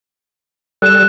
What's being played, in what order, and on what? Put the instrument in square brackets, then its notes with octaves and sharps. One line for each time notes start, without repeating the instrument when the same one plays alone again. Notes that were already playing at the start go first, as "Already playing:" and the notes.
[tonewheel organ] G3 A4 [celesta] F#6 E7